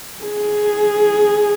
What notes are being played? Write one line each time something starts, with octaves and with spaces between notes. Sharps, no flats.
G#4